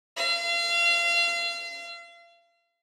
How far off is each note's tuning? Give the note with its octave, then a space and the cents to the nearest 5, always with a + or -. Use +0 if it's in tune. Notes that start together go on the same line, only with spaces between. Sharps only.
F5 -35